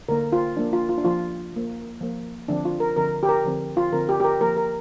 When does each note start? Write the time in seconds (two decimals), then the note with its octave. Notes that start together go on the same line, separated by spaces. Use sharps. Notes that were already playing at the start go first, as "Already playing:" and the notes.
0.09 D3 A#3 A#4
0.32 F4
0.57 F3 A#3 D4
0.73 F4
0.89 F4
0.98 D4
1.04 F3 A#3 F4
1.52 F3 A#3
2.00 F3 A#3
2.48 D3 F3 C4 D4
2.65 F4
2.80 A#4
2.97 D3 F3 C4 A#4
3.23 G4
3.29 A#4
3.45 D3 F3 C4
3.77 F4
3.93 D3 F3 C4 A#4
4.09 G4
4.20 G4
4.24 A#4
4.41 F3 A#3 A#4
4.57 A#4